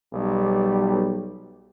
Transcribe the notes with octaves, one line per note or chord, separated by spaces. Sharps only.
B1 G3